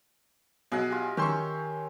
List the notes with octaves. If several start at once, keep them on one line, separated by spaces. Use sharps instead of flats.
B1 G#4 D#5 F#5
F4 G4
D#3 C#4 G5 C6 C#6 E6